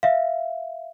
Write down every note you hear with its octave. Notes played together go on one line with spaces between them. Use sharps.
E5 F5